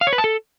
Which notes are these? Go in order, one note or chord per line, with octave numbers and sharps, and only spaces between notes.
F5
C#5
B4
A5
A4